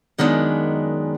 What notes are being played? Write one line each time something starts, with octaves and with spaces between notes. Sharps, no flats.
F#2 D#3 G#3 B3 D4